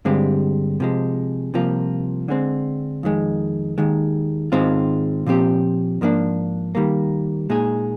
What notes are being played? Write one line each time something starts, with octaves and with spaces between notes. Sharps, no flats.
G2 D3 G#3 C4 G4
C3 F3 G#3
C2 C3 F3 A#3 F4
D3 G#3 C4
F2 D#3 G#3
D#2 D#3 G#3
G#2 D#3 G#3 C4 F4
A#2 F3 C4 G4
G#2 F3 A#3 D4
D#3 G3 A#3
A#2 G#3 D#4 G#4